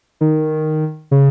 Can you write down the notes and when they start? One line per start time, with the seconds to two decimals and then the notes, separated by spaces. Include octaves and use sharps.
0.21 D#3
1.11 C#3